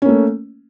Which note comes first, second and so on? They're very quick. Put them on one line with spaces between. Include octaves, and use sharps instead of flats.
C#4 A#3 A3